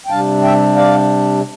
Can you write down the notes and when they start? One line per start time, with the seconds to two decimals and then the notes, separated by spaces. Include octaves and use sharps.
0.06 G5
0.10 C3 G3 D4 F5 A5
0.43 E5 G5
0.76 D5 F5